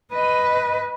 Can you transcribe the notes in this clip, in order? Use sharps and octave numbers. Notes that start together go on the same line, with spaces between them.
B4 D#5